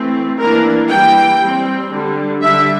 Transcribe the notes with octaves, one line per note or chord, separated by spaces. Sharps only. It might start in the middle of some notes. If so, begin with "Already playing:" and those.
Already playing: E3 A3 C4
E3 A#3 D4 A#4
E3 G3 A#3 G5
G3 C4
D3 G3 D4
D3 G3 D4 E5